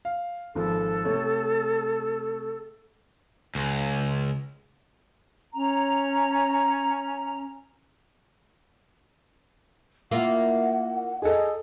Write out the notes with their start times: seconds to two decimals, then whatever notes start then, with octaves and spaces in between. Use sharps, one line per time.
0.05 F5
0.55 G#1 F3 A4
1.05 C3 A3 C#5
3.55 C#2
5.53 C#4 A#5
10.11 A#3 E4 F4 F#5
11.22 G#4 A4 D#5